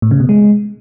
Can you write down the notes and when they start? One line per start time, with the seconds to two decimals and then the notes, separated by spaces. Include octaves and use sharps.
0.02 A2
0.11 C#3
0.20 B2
0.29 G#3